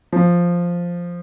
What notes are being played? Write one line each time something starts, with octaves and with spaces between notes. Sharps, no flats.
F3